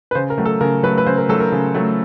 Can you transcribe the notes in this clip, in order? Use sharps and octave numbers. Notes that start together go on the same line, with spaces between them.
B4
C#3 C5
A#4
F#3 A3
A4
C#3 A#4
F#3 A3 B4
B4
C#3 C5
A#4
F#3 A3 A4
A#4
C#3
F#3 A3